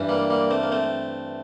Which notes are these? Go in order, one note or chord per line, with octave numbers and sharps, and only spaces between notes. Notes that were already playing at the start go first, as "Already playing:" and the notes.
Already playing: G2 E3
G3 A#3
G3 A#3
A3 C4
A#3
A3 C4